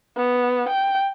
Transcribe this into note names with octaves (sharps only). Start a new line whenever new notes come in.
B3
G5